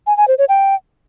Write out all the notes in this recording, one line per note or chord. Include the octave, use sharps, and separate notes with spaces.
G#5
G#5
C5
C#5
G5